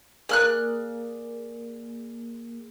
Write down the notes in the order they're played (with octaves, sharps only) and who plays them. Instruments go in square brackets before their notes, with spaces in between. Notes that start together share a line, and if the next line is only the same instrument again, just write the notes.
[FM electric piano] A#3 G#4 [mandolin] D5 F6 F#6